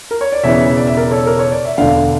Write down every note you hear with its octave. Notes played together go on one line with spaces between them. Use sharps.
A#4
C#5
D5
E1 E2 C#3 E3 C#5 E5
D5
E5
A#4 D5
A4 C#5
A#4
C#5
D5
E5
E1 D2 D3 D5 F5